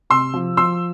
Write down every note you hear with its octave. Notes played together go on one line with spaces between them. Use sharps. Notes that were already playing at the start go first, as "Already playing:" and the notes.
C3 C6 E6
F3
F3 C6 E6